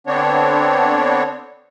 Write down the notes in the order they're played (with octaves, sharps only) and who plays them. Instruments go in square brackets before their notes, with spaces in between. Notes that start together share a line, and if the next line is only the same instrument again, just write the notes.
[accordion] D3 B3 C4 D4 C#5